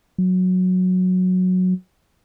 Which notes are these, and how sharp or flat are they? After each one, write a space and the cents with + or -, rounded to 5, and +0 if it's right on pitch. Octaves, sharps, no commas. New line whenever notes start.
F#3 -10